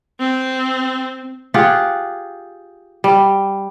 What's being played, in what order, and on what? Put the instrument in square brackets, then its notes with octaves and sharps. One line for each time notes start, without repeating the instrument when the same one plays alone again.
[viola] C4
[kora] F4 G4 G#4 F#5
G3